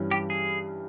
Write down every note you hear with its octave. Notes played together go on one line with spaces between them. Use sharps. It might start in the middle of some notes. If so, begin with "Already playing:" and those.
Already playing: G2 E3 G3 C#4
G4
G#4